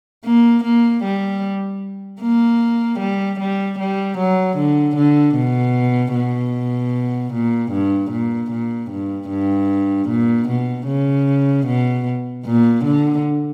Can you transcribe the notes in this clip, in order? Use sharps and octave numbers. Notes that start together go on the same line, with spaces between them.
A#3
A#3
G3
A#3
G3
G3
G3
F#3
D3
D3
B2
B2
A#2
G2
A#2
A#2
G2
G2
A#2
B2
C#3
B2
A#2
D3